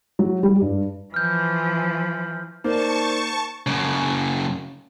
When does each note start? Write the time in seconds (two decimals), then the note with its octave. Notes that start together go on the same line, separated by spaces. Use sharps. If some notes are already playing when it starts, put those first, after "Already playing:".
0.19 F#3
0.43 G3
0.61 G2
1.14 E3 F3 F6 G6
2.64 A#3 D#4 A#4 C5 D5 A5 C#6
3.66 F#2 C#3